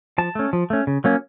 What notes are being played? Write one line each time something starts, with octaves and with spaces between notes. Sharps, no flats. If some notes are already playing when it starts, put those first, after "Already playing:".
F3 A5
A3 C#4
F3
A3 C#4
C#3
F#3 A#3 C#4